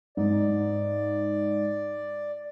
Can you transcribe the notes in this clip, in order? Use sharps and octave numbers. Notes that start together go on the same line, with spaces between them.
G#2 D5